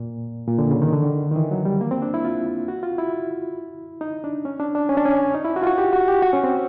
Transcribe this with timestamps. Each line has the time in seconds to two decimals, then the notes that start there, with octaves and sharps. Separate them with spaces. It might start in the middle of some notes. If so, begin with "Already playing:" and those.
Already playing: A#2
0.47 A#2
0.59 D3
0.71 C#3
0.82 D#3
0.92 D3
1.03 D#3
1.32 D#3
1.36 E3
1.51 F#3
1.65 G3
1.81 A#3
1.91 C4
2.02 D4
2.14 E4
2.24 F4
2.68 F#4
2.83 F4
2.98 E4
4.01 D#4
4.24 D4
4.45 C#4
4.60 D4
4.75 D4
4.89 C#4
4.97 D4
5.05 C#4
5.34 D#4
5.44 E4
5.56 F#4
5.63 F4
5.67 F#4
5.78 G4
5.93 F#4
6.08 G4
6.22 F#4
6.33 C#4
6.44 C4